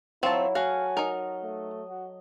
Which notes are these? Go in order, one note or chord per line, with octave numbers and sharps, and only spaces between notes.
F#3 C4 E4 F4 C#5 E5 A5
F#4 A4 F5 G#5
D#4 A#4 D#5
A3
F#4